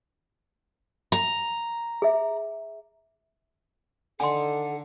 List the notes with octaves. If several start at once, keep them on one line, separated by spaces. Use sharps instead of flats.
A#5
G#4 E5
D3 D#3 A4 F#5 G#5 C6 D6